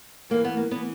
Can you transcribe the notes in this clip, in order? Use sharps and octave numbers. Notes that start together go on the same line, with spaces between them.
G2 E3 A#3
B3
A#3
E3 B3